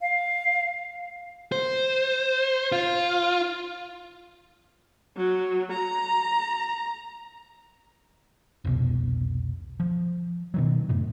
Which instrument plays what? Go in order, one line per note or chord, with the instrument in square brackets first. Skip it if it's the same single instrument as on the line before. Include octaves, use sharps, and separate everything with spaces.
[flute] F5
[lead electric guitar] C5
F4
[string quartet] F#3
A#5
[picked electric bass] F1 C2 B2
F3
B2 D#3 F#3
F#2 A2 C3